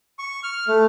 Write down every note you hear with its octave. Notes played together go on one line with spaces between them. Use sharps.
C#6
F6
A3